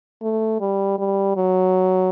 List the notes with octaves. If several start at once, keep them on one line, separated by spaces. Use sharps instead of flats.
A3
G3
G3
F#3